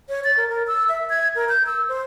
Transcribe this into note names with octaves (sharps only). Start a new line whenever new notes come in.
C#5
A6
A#4
A#4
E6
E5
G#6
A#4
G6
E6
C5